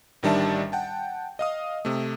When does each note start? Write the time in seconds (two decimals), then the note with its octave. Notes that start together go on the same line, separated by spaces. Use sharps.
0.23 A1 D#3 G3 D4 E5 A5
0.72 F#5 G5 A5
1.39 D#5 F5 D#6
1.85 C3 A3